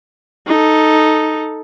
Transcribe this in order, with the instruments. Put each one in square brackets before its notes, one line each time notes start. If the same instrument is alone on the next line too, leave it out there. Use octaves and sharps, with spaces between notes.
[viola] D#4 A4